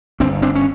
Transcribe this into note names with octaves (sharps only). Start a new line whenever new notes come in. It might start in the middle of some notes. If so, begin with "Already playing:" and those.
G1 C4 D4
C4 D4
C#4